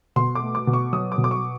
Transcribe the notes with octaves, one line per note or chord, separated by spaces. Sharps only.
B2 C6
D6
A3
D6
B2
C#6
F#3 D#6
D6
B2
D6
C#6